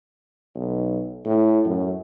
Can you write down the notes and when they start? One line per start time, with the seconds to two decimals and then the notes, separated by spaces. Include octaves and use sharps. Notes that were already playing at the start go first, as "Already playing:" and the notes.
0.55 B1
1.25 A2
1.65 F#2